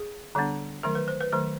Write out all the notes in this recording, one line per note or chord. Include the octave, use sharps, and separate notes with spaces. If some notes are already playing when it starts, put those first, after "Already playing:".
Already playing: G#4
D3 G3 B3 D4
D#3 F#3 A3 A#4
B4
C5
B4
D#3 F#3 A3 C5